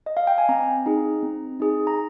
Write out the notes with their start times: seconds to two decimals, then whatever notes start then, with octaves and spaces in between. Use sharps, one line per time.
0.06 D#5
0.17 F5
0.27 G5
0.38 G#5
0.49 C4 A#5
0.86 D#4 G#4
1.23 C4
1.60 D#4 G#4
1.87 A#5